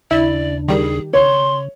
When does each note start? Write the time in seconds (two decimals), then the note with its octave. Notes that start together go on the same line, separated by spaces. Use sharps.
0.11 D#2 C#3 D4 E4 D5
0.68 D#3 G3 G#4
1.13 C#3 C#5 C6